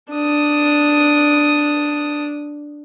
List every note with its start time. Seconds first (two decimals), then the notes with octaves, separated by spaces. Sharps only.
0.12 D4 D#6